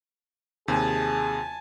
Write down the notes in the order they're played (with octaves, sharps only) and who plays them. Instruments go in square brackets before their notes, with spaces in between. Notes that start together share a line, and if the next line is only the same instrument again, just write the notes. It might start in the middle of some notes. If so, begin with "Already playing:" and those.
[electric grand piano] D#2 C3 [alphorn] G#4 [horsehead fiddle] G#5 A5